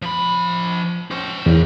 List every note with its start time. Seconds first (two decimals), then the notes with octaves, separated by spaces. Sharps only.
0.02 F3 B5
1.11 C#4 C5
1.46 E2 C#3 A#4